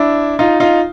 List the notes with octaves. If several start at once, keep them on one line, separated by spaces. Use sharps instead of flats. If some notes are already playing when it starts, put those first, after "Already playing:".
Already playing: D4 E4
D#4 F4
D#4 F4